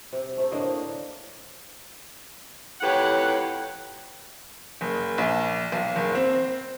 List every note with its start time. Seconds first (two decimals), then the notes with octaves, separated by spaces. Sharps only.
0.13 C3
0.37 C3 A3
0.51 A2 D3 A#3 D#5
2.81 F2 A2 G4 B4 C#5 F#5
4.81 F#1
5.18 A#1
5.72 B1
5.96 F#1
6.15 C4